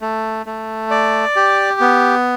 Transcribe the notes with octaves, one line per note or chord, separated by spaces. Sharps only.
A3
A3
D5
G4
B3